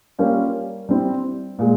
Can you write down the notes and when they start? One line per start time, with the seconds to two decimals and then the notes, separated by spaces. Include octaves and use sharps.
0.18 G3 A#3 C#4 F4
0.89 G3 C4 E4
1.59 A#2 G#3